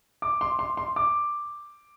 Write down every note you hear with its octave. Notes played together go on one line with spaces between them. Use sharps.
D6
C6
C6
C6
D6